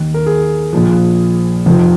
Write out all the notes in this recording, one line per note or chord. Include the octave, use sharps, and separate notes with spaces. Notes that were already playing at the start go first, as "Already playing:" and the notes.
Already playing: D#2 D#3
A#4
G#4
A#1 A#2 F3
F1 F2 F3